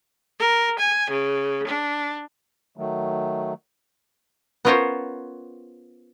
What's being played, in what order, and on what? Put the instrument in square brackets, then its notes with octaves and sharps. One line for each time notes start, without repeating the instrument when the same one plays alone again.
[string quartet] A#4
G#5
C#3
D4
[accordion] D#3 F#3 A3
[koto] B3 C#4 F4 A#4 C5 C#5